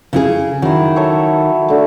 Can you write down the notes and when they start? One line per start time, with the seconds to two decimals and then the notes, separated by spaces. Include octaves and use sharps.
0.13 C#3 E4 G#4
0.62 D#3 F#3 E4
0.96 A4 C#5 E5
1.68 D3 A3